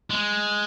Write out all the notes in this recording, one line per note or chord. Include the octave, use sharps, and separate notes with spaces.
G#3